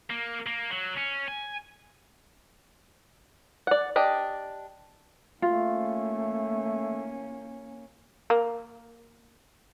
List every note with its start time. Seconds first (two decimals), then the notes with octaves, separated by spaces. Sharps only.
0.10 A#3
0.47 A#3
0.70 F#3
0.97 C#4
1.28 G#5
3.67 D5 F#5
3.96 D4 G4 D#5
5.42 A3 A#3 C#4 F4
8.30 A#3